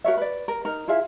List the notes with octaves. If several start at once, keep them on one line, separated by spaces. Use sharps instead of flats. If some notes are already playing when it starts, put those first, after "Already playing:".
F#4 A#4 C#5 E5
B4 D5
A#4
D#4 A#4
E4 F4 G#4 E5